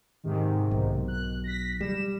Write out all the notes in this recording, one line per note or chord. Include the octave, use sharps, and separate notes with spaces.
G#2 C3 D#3
B1
F#6
A#6 B6
G3 E7